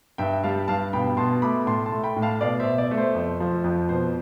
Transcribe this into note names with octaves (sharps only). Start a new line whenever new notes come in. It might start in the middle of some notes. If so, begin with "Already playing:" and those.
G2 E5 G5
G3 F5 A5
G2 F5 A5
B2 G5 B5
B2 A5 C6
A3 B5 D6
A2 A5 C6
A5 C6
A3
G5 B5
A2
F5 A5
B2 D5 F5
C5 E5
B2
D5
A3
C5
F2
F3
F2
B2 C5